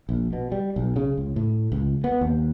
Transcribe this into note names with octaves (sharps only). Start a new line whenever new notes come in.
A#1
B2
G3
B1
C#3
C#2
A2
C#2
B3
D#2